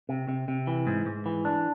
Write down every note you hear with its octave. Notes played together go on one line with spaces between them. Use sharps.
C3
C3
C3
E3
G#2
G#2
E3
D4